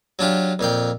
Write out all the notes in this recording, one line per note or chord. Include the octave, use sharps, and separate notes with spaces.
F#3 D4 F4 G4
F2 A#2 F5 G5